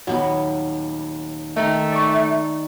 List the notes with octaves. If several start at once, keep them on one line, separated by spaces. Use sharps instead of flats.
D#1 F#3 B3
D#3 A3 D#4 A#5
D5 C#6